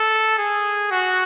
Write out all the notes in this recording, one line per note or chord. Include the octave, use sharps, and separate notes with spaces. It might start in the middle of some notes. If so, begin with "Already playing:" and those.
Already playing: A4
G#4
F#4